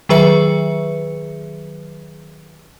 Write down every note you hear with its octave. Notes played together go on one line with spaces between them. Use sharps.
D#3 F#3 G#4 B4 E5 C#7